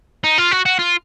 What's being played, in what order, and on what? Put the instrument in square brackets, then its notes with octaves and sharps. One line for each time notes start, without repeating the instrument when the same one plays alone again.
[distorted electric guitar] D#4
F4
F#4
F#4
F4